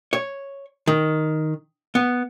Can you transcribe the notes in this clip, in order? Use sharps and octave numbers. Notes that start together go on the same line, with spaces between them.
C#5
D#3
B3